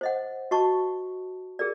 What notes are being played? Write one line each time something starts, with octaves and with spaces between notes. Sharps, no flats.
C5 D#5 F#5
F#4 D#5 A5 C#6
G#4 A#4 D5